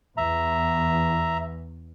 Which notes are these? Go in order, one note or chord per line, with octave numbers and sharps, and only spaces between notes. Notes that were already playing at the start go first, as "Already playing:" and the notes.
E2 E5 A#5